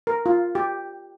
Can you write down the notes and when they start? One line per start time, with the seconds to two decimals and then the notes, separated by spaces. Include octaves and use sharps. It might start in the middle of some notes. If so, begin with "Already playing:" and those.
0.07 A#4
0.26 F4
0.55 G4